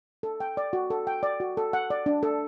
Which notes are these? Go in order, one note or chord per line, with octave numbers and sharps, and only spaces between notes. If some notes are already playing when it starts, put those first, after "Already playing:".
A4
G5
D5
F#4
A4
G5
D5
F#4
A4
F#5
D5
D4
A4